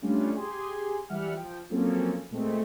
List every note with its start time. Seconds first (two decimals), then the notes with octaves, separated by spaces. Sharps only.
0.02 G3 A3 C#4 D4 F4
0.34 G4 G#4 G#5 C6
1.09 E3 G3 E5 F#5 F6
1.32 F3 G5
1.70 F3 F#3 A#3 C4 C#4 A4
2.30 A#2 G#3 A3 C4